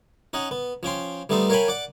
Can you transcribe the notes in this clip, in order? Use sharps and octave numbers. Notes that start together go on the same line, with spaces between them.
C#4 D#4 D#5 F#5
B3
F3 C#4 G5 C6
G3 A3 B3 D#4 A4 C5
A#4 C#5 F5 G5 G#5 B5
D5 F#5 D6